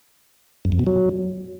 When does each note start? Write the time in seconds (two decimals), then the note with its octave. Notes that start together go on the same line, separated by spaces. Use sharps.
0.65 F#2
0.72 F2
0.79 B2
0.87 F#3